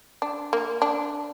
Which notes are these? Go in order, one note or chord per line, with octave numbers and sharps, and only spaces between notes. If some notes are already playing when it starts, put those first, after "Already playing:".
D4
A#3
D4